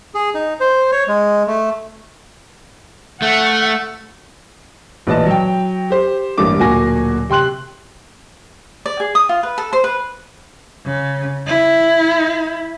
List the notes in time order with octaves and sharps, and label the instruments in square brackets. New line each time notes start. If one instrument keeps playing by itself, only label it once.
[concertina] G#4
D#4
C5
C#5
G#3
A3
[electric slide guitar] A3 [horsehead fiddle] F#5
[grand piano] A1 A#2 B4 D5 D#5 A5
F#3 G5
G4 C5
A1 G2 G3 A#3 D4 D6
D1 A#2 A#3 F#4 G#5 A#6
C3 G5 C6 F#6 F#7
[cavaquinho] D5
G#4
D#6
F4
B4
A4
C5
B4
[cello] C#3
E4